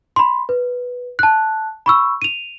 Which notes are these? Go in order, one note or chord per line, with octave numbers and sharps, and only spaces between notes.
B5 C6
B4
A5 F#6
B5 C#6 E6
D#7 F7